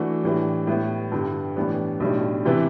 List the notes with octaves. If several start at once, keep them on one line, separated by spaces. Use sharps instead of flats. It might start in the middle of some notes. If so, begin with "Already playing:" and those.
Already playing: E3 A3 D4 F#4
A2 E3 G3 D4
A2 G3 B3
G2 D3 G3
A2 E3 G3 B3 D4
B1 A2 G3 D4
C3 E3 B3 E4